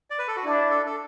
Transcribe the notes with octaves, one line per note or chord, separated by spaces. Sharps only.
D5
B4
A4
F#4
D4 E4
A4
A4